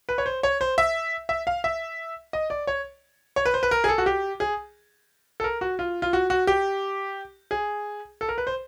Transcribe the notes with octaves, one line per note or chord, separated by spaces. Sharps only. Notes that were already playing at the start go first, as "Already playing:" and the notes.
B4
C#5
C5
C#5
C5
E5
E5
F5
E5
D#5
D5
C#5
C#5
B4
C5
B4
A#4
G#4
A4
F#4
G4
G#4
A4
A#4
F#4
F4
F4
F#4
F#4
G4
G#4
A4
A#4
B4
C5